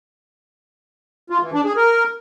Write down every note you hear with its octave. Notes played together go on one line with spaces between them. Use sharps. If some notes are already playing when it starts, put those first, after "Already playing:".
F4
E3
D4
G#4
A#4